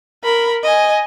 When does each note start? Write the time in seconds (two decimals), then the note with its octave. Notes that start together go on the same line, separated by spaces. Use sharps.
0.24 A#4 B5
0.63 D#5 G#5